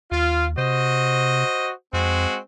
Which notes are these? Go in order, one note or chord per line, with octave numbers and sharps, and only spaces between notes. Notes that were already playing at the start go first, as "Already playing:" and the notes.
D#2 F4
C3 F#4 C5 D#5
F2 G#3 C4 F#4